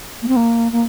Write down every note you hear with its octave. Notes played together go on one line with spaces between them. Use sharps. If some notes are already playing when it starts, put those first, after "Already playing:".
A#3
C4
A#3
A#3